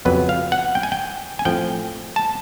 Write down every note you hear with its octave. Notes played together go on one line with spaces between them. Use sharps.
F2 C#3 F#3 B3 B4
F5
F#5
G5
G#5
G5
G#5
A2 F3 A3 C4 G5
A5